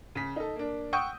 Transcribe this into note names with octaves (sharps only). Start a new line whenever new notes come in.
C#3 B6
D#4 A4
A#3 D4
F#5 G5 C#6 D#6 E6 G6